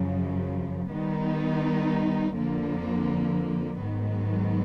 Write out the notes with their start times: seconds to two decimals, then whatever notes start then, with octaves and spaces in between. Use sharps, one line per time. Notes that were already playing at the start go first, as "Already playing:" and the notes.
Already playing: F#2 C#3 F3
0.92 D#3 G3 B3 D#4
2.36 F2 D3 F3 A#3
3.79 G#2 D#3 F#3 B3